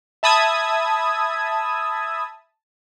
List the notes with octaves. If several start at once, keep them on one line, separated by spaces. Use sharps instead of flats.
E5 A5 B5 D#6 E6 G#6